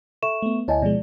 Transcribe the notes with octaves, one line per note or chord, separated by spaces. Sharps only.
A4 E5 C#6 E7
A3 B3
D2 E4 C#5 D#5 G#5 A5
B2 F3 G#3 D5